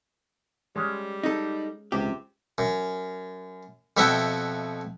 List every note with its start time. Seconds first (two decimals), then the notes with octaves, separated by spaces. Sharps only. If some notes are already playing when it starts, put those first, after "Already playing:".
0.76 G3 G#3 C#4 C#5
1.24 D#4 A4
1.92 C#2 C3 G4
2.58 F#2
3.97 F2 B2 E4 E5 F#5 G5